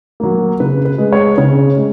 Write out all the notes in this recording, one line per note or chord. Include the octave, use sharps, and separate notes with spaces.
F#3 A#3
C#3 B4
B4
G#3
C#5
C#3 C#5
G#3